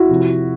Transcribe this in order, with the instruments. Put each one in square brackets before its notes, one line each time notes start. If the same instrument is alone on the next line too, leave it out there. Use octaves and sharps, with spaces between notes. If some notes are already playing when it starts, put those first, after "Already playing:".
Already playing: [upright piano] E4 F#4
C3 F3